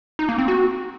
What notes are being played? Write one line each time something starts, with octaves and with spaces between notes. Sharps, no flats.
D#4
A#3
C4
F#4